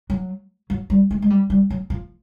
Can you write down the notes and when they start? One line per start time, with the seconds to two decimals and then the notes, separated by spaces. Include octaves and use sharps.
0.10 F#3
0.70 F#3
0.90 G3
1.11 G#3
1.22 G#3
1.30 G3
1.50 G3
1.70 F#3
1.90 F3